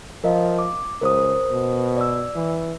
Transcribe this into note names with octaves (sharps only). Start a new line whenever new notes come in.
F3 A#4 D#5 F5
D6
C#2 A#4 C5 D#6
B2
D5 E6
E3